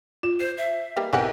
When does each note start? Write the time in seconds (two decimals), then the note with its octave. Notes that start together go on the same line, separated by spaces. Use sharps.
0.23 F4 E7
0.40 C5 C7
0.58 E5
0.96 G3 A#3 D#4 B4
1.13 B1 E3 C4 G4 A#4 F#5